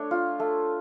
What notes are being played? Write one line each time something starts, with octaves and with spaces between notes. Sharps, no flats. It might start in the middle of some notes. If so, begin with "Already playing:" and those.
Already playing: A3 D4 C#5
F4
A3